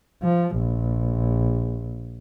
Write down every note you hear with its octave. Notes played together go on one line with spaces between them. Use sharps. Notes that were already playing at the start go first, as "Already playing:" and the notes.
F3
A#1